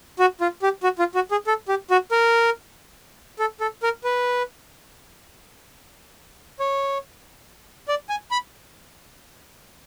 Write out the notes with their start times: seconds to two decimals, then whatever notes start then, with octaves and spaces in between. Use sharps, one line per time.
0.19 F#4
0.41 F4
0.62 G4
0.83 F#4
0.99 F4
1.15 F#4
1.31 G#4
1.47 A4
1.68 G4
1.91 F#4
2.12 A#4
3.39 A4
3.61 A4
3.83 A#4
4.04 B4
6.60 C#5
7.88 D5
8.09 G#5
8.31 B5